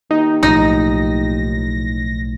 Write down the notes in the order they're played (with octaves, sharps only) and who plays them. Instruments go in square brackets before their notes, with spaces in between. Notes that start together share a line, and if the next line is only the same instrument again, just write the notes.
[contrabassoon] D#2 [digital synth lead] D#4
[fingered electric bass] B1 A2 F3 [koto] D#4 [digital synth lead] A#6